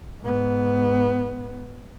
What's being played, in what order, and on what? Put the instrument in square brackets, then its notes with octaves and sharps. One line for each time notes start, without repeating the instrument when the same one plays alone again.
[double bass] G#2 B3